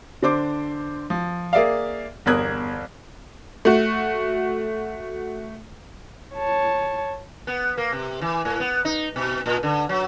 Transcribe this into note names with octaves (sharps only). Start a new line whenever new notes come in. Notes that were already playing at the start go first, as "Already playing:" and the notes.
D3 D4 C5 D6
F3
A#3 G#4 D5 E5 F5
G1 E2 A#4 D#6 F#6 G#6
A3 F#4
C#5 A5
B3
A#3
C3
E3
A2
B3
D#4
B2
A#2
D3
F#3